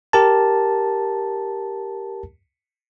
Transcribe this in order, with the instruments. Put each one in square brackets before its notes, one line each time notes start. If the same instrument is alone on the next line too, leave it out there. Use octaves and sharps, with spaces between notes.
[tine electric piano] G4 A#4 A5